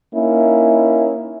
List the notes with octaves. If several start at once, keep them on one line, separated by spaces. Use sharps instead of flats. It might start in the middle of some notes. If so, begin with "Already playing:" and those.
A#3 C#4 D#4 E4